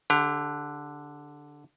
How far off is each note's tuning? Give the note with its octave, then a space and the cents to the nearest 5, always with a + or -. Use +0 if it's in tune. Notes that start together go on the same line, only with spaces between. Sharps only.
D3 +0 G4 +30